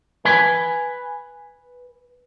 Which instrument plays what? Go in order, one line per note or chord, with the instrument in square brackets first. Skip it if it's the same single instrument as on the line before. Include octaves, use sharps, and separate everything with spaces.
[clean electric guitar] B4 G#5